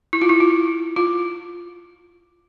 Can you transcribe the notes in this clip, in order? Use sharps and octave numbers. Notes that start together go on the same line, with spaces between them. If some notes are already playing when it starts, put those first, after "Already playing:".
E4
F4
E4
F4
F4